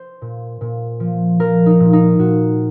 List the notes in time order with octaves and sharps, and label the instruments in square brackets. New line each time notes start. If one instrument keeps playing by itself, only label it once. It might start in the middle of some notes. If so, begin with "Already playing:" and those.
Already playing: [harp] C5
A#2
A#2
F3
F3 A#4
D#4
A#2
D#4
A#2 F#4